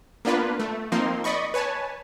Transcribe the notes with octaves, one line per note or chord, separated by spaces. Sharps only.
A#3 B3 D4 F4 B4
A3
F3 A#3 C4 D#4 C6
D5 D#5 B5 C#6
B4 C#5 G#5 A5